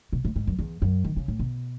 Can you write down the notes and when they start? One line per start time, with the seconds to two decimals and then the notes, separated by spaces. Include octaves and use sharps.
0.12 B2
0.25 A2
0.36 G#2
0.47 F#2
0.59 E2
0.82 F#2
1.04 D#3
1.17 C#3
1.28 A2
1.39 B2